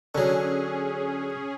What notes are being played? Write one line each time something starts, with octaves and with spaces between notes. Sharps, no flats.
D3 F#3 C#4 G#4